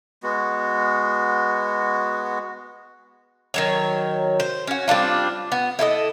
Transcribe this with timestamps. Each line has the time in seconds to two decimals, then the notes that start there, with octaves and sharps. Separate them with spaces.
0.23 G#3 B3 F#4
3.54 D#3 F#3 C#5
4.40 C5
4.67 C#4 F#4
4.88 G3 C4 D4 F4
5.52 B3
5.79 E4 A4 C#5 D#5